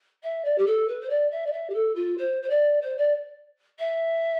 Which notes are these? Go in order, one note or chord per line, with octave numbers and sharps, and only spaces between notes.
E5
D5
G4
A4
B4
C5
D5
E5
D5
E5
G4
A4
F4
C5
C5
D5
C5
D5
E5